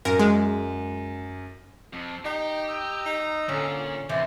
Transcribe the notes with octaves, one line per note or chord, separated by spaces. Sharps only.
F#2 A#4
G#3
F2
D#4 G4 A#5
D#5 A#5 E6
D#4
A#2 D3 C#4
D#2 C3 E3 C5 D5